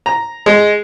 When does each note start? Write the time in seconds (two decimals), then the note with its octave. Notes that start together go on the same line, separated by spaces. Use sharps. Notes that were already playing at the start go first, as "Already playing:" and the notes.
0.06 A#5
0.46 G#3